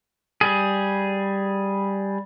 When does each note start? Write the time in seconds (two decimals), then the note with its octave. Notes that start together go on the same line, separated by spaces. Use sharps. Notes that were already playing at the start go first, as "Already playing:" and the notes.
0.41 G3 G#4